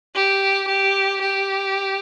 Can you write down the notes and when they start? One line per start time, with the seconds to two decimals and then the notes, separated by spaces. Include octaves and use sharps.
0.15 G4
0.68 G4
1.22 G4